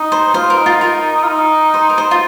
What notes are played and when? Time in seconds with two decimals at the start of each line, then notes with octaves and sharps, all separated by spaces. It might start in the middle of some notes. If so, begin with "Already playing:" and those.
Already playing: D#4
0.12 C5
0.34 F4 C5
0.50 A#4
0.57 D#4
0.66 F4
0.81 A#4
1.23 F4
1.27 D#4
1.74 C5
1.90 A#4
1.98 C5
2.11 F4